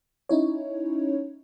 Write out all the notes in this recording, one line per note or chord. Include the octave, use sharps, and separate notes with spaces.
C#4 D#4 E4 C#5